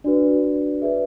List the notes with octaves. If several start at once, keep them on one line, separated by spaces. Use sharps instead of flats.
D4 F#4 B4 D5
G#4 B4 D5 E5